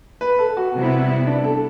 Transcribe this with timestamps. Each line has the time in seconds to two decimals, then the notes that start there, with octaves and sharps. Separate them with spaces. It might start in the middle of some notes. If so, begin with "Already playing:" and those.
0.21 B4
0.39 A4
0.57 F#4
0.74 C3 G3 B3 E4
1.27 D4
1.44 A4